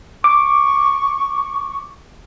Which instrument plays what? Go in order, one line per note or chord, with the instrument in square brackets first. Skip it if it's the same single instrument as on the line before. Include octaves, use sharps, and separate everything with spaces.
[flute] C#6 [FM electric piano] D6